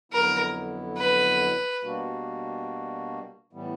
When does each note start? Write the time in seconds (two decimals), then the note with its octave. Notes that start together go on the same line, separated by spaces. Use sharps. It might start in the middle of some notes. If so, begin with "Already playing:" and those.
0.12 F2 D3 F#3 B3 E4 A#4
0.97 B4
1.82 B2 G3 A#3 D4 F#4
3.53 A2 E3 G3 B3